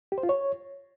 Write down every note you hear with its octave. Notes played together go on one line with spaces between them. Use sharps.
G4
C5
F4
C#5